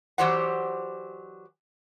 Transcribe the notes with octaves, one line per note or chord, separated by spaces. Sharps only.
E3 F#3 G4 C5 D5 F#5